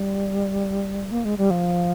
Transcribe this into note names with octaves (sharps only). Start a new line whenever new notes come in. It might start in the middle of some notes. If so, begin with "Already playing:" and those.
Already playing: G3
A#3
G#3
G3
F3